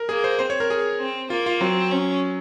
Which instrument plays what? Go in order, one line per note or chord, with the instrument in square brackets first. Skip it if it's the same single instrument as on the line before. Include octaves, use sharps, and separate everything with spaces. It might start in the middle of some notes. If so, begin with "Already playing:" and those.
Already playing: [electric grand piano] A#4
[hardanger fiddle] A#3 [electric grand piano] G#4
[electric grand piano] C5
[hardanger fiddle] C4 [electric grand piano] C5
[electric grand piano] C#5
A#4
G#4
[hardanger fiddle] C4
[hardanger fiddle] A#3 [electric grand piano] F4
[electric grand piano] F4
[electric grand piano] F#3 [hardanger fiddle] C4
[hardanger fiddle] C#4